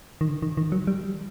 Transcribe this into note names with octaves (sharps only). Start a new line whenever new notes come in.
D#3
D3
D#3
D#3
F#3
G3